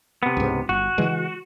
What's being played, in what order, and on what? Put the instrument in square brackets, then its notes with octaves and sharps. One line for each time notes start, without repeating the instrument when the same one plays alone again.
[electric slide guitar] C3 B3
[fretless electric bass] C#2 G#2
[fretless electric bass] G1 [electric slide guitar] F#4
[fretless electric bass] C#3 E3 G#3